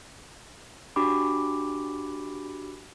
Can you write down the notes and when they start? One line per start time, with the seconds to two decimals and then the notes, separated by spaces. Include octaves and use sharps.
0.96 D4 F#4 G4 B5 D6